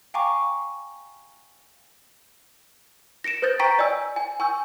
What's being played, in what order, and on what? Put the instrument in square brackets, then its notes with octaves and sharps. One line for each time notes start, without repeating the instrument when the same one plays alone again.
[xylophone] F5 G5 G#5 A#5 C#6 D6
A#6 C#7 D7 E7
B4 C5 D#6 G6 A6 A#6
G5 A#5 C#6 A6 B6 D7
D5 D#5 G#5 E6
G#5
G5 G#5 C#6 E6 G6